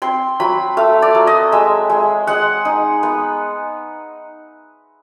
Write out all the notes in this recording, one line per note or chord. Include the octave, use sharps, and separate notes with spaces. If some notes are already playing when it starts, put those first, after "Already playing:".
C4 C6
F#3 B5
A3 F5
D5
F#3
D#5
G#3 E5
G#3
G#3 F#5
D#4
B3